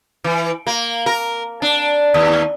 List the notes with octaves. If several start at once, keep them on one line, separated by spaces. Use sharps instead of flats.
E3
A#3
A#4
D4
D#2